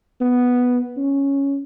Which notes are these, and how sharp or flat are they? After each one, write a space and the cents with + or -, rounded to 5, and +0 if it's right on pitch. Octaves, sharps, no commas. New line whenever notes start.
B3 +0
C#4 +0